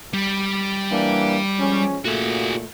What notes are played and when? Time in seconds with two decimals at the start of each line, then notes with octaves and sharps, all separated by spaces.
0.13 G3
0.91 E3 A#3 D4
1.59 F3 G#3 C#4
2.05 A#2 A3 F#4 G#4